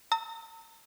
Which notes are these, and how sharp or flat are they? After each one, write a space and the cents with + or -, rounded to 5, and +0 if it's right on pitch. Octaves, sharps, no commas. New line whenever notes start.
A#5 -45 E6 -45